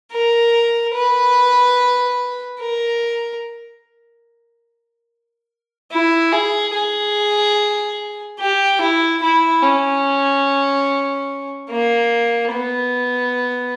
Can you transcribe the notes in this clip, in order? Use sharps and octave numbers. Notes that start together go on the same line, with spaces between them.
A#4
B4
A#4
E4
G#4
G#4
G4
E4
E4
C#4
A#3
B3